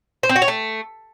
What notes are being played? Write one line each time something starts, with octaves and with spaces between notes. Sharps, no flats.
C5
C4
F#4
C#5
A3